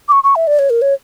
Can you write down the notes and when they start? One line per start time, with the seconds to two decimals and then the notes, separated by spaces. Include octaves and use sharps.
0.09 D6
0.12 C#6
0.24 C#6
0.36 E5
0.47 D5
0.59 C#5
0.70 A#4
0.82 C#5